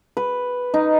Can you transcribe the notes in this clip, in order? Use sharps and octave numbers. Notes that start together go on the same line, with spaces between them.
B4
D#4